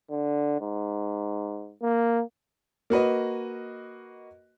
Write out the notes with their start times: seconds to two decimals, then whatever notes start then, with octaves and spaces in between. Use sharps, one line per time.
0.10 D3
0.61 G#2
1.82 A#3
2.90 A#3 F#4 B4 D#5